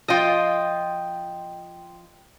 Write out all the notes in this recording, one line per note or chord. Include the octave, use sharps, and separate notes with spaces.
F3 F4 D#5 G5